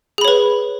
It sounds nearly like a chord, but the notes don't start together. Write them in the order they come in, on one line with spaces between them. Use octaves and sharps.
G#4 B5 C#5 B4